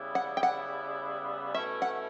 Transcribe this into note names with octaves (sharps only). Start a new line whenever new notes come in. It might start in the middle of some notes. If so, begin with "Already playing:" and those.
Already playing: C#3 G3 B3 E4
F#5
G5
F#5
B2 A3 C#4 E4 E5
F#5